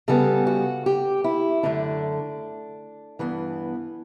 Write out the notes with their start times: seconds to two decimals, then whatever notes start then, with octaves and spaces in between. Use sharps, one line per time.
0.08 C#3 G3 B3 A4
0.47 F#4
0.86 G4
1.24 E4
1.63 F#2 D3 A3 D4
3.19 G2 E3 B3